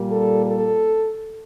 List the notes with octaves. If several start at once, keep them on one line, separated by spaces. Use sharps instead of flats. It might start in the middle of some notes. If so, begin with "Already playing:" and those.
Already playing: A#2 G3 A#3
A4
A4